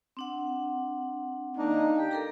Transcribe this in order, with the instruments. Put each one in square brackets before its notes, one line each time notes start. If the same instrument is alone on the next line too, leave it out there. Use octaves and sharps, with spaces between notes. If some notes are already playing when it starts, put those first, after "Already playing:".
[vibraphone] C4 D4 F#5
[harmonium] D#3 A#3 [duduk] D4 [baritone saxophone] D#4
[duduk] G4 [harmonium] G5
[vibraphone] A4 A#4 A#5